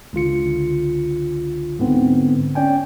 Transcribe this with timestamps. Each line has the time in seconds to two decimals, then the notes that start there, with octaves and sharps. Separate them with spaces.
0.13 C#2 D3 F4 C#7
1.79 G#2 D3 B3 C4
2.55 C#4 D5 G5 G#5